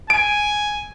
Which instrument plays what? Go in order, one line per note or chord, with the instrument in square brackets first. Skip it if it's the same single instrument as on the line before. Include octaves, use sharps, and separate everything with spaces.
[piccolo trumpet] G#5 [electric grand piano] D7